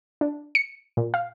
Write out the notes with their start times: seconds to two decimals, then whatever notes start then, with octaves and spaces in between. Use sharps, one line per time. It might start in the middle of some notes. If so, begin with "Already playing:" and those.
0.21 D4
0.55 C#7
0.97 A#2
1.14 F5